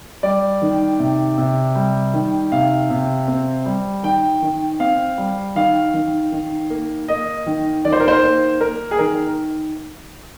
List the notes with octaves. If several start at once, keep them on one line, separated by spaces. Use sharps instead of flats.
G3 D5
D#3
C3
C3
G3
D#3
C3 F5
C3
C4
G3
D#3 G5
D#3
C4 F5
G3
D#3 F5
D#3
D#3
A#3
A#3 D#5
D#3
D#3 D5
C5
A#4
C5
A#3
A#3 A#4
G#4
D#3 A#4